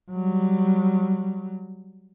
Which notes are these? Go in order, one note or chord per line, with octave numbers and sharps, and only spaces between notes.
F#3 G3